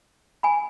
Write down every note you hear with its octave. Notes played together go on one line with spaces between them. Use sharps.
G#5 B5